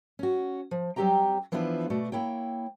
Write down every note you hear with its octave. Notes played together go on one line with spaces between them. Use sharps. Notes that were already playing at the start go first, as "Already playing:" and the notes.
C#4 F#4
F3
F#3 G3 C4 G4 G5 A#5
E3 F3 B3 D4 E4 F4
B2 A3 F#4 D5
A#3 E4 C#5 G5